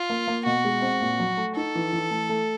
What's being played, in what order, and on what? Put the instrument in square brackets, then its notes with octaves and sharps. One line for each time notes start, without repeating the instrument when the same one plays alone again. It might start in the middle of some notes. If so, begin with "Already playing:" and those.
Already playing: [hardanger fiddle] F4
[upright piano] A#3
A#3
[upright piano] B2 [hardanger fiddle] F#4
[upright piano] G#3
C4
A#2
F#3
A3
[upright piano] D#4 [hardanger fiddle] A4
[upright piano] E3
E3
A3
A3